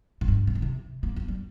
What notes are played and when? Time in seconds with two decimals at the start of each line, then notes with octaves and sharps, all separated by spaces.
0.21 A#2
0.28 G2
0.47 C3
0.55 D#3
0.62 C3
1.03 A#3
1.16 A#3
1.28 G3